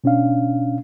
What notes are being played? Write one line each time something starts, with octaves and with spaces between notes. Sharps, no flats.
B2 C#4 D4 F5